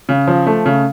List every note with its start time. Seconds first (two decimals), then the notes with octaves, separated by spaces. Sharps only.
0.09 C#3
0.28 F3
0.47 A3
0.66 C#3